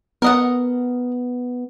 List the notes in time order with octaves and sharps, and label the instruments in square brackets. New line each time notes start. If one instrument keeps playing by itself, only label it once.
[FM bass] B3 [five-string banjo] A#4 D#5 F#5